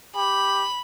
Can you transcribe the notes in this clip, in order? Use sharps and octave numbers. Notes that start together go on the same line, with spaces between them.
G4 B5